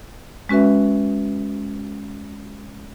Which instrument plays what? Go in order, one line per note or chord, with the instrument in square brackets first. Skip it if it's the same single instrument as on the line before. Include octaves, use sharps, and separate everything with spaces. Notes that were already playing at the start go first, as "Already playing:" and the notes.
[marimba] G#3 C#4 F#4 B4 E5